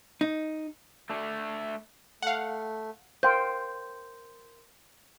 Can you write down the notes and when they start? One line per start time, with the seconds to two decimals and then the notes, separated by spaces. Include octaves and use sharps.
0.21 D#4
1.10 A3 D4
2.22 A3 F5 F#5
3.23 A#4 C5 F5 G5 C6 G6